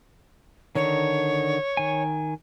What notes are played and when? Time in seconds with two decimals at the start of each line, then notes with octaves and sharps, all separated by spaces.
0.75 D3 D#3 C#5
1.77 D#3 G#5